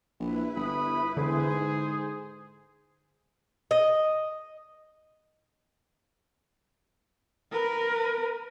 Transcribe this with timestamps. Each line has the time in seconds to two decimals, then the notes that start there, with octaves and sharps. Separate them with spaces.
0.20 A#1 E4 B4
0.56 G1 B5 D#6
1.17 E1 D3 G#4 C5
1.50 G#2
3.71 D#5
7.51 A#4 B4